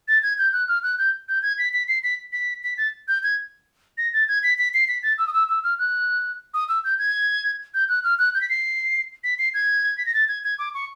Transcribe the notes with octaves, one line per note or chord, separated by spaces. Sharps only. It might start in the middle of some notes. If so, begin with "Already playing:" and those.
A6
G#6
G6
F#6
F6
F#6
G6
G6
G#6
B6
B6
C7
B6
B6
B6
A6
G6
G#6
A#6
A6
G#6
B6
B6
C7
B6
A6
E6
D#6
E6
E6
F6
F#6
D#6
E6
G6
G#6
G6
F#6
F6
F#6
G6
B6
C7
B6
C7
G#6
B6
A#6
A6
G#6
G#6
D6
C#6